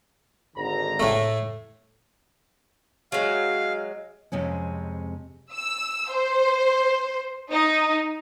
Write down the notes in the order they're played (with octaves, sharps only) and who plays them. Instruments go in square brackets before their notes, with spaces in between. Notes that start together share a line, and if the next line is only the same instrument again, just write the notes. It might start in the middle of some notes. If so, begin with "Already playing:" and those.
[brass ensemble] G#1 D3 A#5
[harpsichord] A2 A3
[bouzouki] F#3 G#3 [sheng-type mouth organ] F5
[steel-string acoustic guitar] F2 C3 G#3 C#4
[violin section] E6
C5
D#4